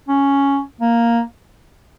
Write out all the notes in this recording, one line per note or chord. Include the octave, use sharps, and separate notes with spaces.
C#4
A#3